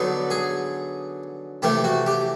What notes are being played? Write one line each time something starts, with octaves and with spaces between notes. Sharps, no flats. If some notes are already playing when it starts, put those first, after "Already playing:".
Already playing: D3 F#3 B3 D#4
G#4
C3 E3 A3 G4
F#4
G4